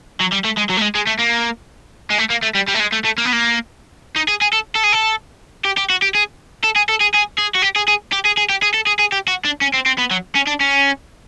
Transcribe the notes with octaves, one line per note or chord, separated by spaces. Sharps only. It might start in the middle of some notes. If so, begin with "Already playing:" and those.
F#3
G3
A3
G#3
F#3
A3
G#3
G#3
A3
A#3
G#3
A3
A#3
A3
G3
G3
A3
G#3
A3
A3
A#3
B3
A#3
D#4
G#4
G#4
A4
A4
G#4
A4
G4
G4
F#4
G4
G#4
A4
G#4
A4
G#4
G#4
G#4
F#4
G4
G#4
G#4
G4
G#4
G#4
G4
G#4
A4
G#4
G#4
G4
F#4
D4
C#4
C4
C4
B3
F#3
C#4
D4
C#4